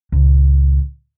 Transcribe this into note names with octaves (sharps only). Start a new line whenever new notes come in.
C#2 A#2